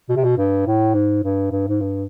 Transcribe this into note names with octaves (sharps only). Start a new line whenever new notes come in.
B2
C3
B2
G2
A2
G#2
G2
G2
G#2
G2